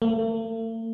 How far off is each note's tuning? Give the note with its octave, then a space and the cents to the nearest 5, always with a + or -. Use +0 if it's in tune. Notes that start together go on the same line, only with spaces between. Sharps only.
A3 +45